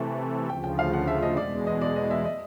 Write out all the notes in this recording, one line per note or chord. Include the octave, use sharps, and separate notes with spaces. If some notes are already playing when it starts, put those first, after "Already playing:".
Already playing: C3 E3 A3
D2 C#3 F3 G5
G5
F5
F#5
E5
D#5
E2 B2 G#3 D5
D#5
D5
D#5
E5
D#5